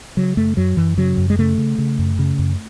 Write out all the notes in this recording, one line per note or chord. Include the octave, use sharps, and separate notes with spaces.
C#3 F#3
F#2 A3
F#2 F#3
F#2 E3
C#3 F#3
F#2
G#3
C#3 A3
C#3
C#3
F#2
C#3
F#2